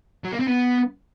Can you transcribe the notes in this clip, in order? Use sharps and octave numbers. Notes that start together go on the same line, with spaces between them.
F#3
A#3
C4
B3